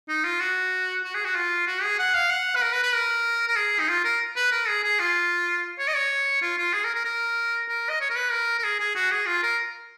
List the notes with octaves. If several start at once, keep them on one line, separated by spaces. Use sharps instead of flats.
D#4
F4
F#4
F#4
G#4
F#4
F4
F#4
G#4
F#5
F5
F#5
B4
A#4
B4
B4
A#4
A#4
G#4
D#4
F4
A#4
B4
A#4
G#4
G#4
F4
C#5
D#5
C#5
F4
F4
G#4
A#4
A#4
A#4
A#4
D#5
C#5
A#4
B4
A#4
A#4
G#4
G#4
F#4
G#4
F4
A#4